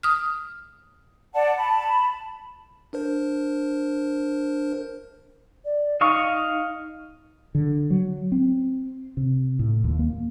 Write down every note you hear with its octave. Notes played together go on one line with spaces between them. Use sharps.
D#6 F6
D5 F#5 A5
A5 B5
D4 A#4 C5
D5
D#4 D#5 F5 C#6
D3
F#3
C4
C3
A2
D#2
A#3